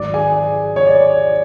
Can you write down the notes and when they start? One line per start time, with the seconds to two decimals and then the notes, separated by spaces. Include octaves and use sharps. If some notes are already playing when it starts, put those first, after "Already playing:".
Already playing: G#1 G#2 F#3 D5 D6
0.14 G#4 G#5
0.76 C#5
0.87 D5